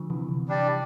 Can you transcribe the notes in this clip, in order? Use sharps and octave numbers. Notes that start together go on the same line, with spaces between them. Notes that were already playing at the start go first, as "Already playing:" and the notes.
Already playing: D3 F3
C3 E3
C3
G3 D4 G4 D5